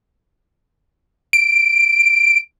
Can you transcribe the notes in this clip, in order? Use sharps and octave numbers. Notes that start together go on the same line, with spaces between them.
D7